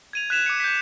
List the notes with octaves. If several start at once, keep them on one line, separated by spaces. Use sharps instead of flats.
G#6 D#7 F7
F#6 G#6 B6 E7 F7
D6 C#7
G6 B6